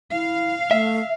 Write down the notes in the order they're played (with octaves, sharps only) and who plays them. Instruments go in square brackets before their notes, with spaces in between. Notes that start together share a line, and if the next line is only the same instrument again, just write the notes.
[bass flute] E4 [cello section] F5
[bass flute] A3 [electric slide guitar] E5